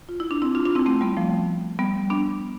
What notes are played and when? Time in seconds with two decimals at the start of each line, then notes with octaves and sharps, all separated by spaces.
0.09 F4
0.20 E4
0.31 D4
0.42 C4 E4
0.55 D4 F4
0.65 D4 F4
0.75 C4 E4
0.86 A3 C4
1.01 G3 B3
1.17 F3 A3
1.79 G3 B3
2.10 B3 D4